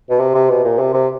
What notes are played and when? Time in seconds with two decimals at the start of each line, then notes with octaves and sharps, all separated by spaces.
0.10 B2
0.19 C3
0.34 C3
0.49 B2
0.64 A#2
0.79 C3
0.93 C3